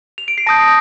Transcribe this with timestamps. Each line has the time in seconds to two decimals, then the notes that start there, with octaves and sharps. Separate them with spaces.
0.18 F7
0.28 D7
0.38 C7
0.46 A5 D#6 G6 A#6